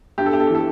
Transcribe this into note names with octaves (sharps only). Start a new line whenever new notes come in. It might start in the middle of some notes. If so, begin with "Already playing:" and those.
G2 G4
A4
G4
A4
G4
E3 A4